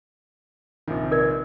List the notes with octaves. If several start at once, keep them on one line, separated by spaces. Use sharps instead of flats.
A#1 C3 D#3
A#4 D5